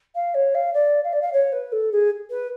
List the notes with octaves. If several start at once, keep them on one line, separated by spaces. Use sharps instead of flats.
F5
C#5
F5
D5
F5
D5
F5
C#5
B4
A4
G#4
B4